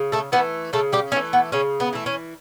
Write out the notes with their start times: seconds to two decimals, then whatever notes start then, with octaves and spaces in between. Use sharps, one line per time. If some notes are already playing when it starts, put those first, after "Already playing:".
Already playing: C#3
0.12 A3 A4
0.32 E3 B3 B4
0.36 A3
0.73 C#3 A3 A4
0.93 G3 G4
1.12 E3 A3 C#4
1.33 B3
1.52 C#3 C#4
1.80 B3
1.93 E3 A3
2.06 C#4